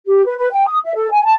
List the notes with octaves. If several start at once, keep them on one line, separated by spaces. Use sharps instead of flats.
G4
B4
B4
G5
D#6
E5
A4
G#5
A5